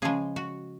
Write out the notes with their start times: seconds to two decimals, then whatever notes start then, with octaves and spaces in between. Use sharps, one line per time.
0.02 C#3 F3 G#3 G#4
0.36 F#4